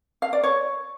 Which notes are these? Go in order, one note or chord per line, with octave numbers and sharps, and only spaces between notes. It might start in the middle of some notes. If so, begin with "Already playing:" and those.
F5
D5
C#5